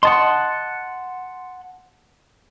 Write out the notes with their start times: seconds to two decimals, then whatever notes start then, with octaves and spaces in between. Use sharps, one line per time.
0.03 D#5 F#5 A5 C6 D#6